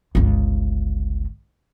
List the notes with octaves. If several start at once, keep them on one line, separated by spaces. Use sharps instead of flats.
G1 C#2